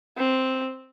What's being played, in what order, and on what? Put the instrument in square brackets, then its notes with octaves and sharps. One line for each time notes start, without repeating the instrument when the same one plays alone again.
[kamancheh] C4